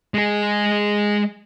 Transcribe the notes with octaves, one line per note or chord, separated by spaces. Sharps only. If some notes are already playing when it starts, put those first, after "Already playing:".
G#3 G#4